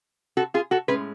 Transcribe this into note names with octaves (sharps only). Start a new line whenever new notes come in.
F#4 A4
F4 G#4
F#4 A4
A2 G#3 C#4 G#4 B4